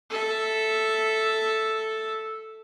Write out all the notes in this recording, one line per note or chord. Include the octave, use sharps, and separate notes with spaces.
A4 E5